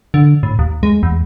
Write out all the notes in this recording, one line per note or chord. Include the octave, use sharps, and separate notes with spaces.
D3
A2
D#2
G#3
E2